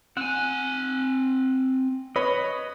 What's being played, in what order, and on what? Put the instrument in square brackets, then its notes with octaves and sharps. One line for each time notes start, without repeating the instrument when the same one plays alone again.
[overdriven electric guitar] C4 G#5 [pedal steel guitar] F#5
[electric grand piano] B4 C#5 B5 [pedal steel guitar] D#5